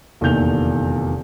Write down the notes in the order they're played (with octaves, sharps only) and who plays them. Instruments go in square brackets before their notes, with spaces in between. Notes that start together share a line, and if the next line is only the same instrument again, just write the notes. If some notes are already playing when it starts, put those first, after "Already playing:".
[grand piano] F1 E2 A#2 D#3 G6 F7